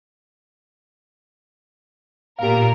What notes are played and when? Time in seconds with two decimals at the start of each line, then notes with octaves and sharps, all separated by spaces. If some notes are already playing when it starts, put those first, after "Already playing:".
2.39 A#2 G4 A#4 F5